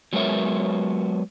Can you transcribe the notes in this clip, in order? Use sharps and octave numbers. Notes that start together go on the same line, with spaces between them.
F#3 G#3 B3 A#4 C#5 E5